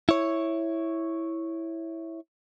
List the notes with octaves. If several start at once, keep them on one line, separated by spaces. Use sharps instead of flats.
E4 C#5